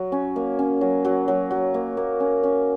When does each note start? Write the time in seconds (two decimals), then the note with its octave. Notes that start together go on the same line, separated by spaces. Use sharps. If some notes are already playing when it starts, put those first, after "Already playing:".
Already playing: F#3
0.12 C#4
0.36 A#3
0.59 C#4
0.81 F#3
1.05 F#3
1.28 F#3
1.51 F#3
1.74 A#3
1.97 A#3
2.20 C#4
2.43 C#4